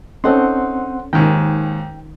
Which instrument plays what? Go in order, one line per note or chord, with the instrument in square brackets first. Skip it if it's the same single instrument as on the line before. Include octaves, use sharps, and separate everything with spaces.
[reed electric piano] C4 F#5 C6 [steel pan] C#4 A4 [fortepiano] D#4
[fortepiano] D#2 G#2 [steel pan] D#3 [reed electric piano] G5